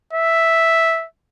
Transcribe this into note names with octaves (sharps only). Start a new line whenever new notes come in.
E5